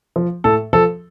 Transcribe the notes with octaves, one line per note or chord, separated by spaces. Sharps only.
F3
A2 A4
F3 A4